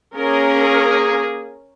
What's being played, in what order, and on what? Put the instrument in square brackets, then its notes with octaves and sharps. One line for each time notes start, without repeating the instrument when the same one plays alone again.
[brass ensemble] A#3 G#4 [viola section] C#4 A#4